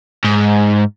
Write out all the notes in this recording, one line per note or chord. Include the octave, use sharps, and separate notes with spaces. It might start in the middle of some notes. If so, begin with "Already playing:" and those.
G#2